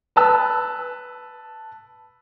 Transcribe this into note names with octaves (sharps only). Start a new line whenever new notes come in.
B4 A5 E6